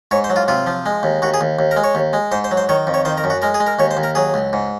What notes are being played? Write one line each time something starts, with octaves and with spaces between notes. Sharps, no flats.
G#2 C#5
C5
F#3
F4
C3 F4
F3
G#3
D#2
D#2 F#4
G#4
D#2
D#2
A#4
G#3
C#5
D#2
G#3
G#2 C5
C5
F#3
C5
D#3 C#5
F2
C#5
D#3 C5
A#4
F#2
F#4
G#3 A#4
G#4
G#3
A#4
D#2 C#5
C5
D#2
A#4
F#3 G#4
C#2
G#2